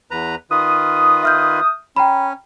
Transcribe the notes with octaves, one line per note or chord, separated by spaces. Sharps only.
E2 B4 A#5
D#3 F4 B4 D#6
E5 F6 G6
C#4 G5 A#5 B5